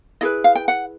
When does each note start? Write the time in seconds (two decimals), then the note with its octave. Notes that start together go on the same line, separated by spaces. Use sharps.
0.21 E4 G#4 B4 D#5
0.44 F5
0.55 G5
0.68 F#5